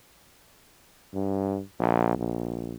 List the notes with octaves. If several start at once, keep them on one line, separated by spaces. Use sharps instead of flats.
G2
A#1
A#1